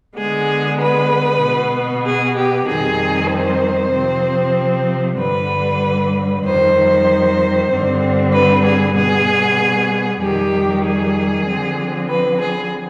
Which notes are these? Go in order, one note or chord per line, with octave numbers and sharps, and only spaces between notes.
D3 G#3 B3 G#4
B4
B2 B3
G#4
G4
F2 D#3 G3 C4 G#4
C5
C3 F3 C4
G2 D3 G3 B4
F2 D#3 G3 C5
G2 D3 G3 C4
B4
G#4
B2 G3 B3 G#4
F2 D#3 G3 G4
G#4
D3 F3 C4
B4
G#4